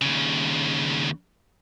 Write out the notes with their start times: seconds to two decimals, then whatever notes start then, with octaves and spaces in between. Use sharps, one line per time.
0.01 D#2 C#3